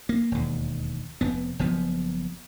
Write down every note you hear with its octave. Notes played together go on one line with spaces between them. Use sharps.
A#3
E1 D#2
F1 B3
F#1 F3 B3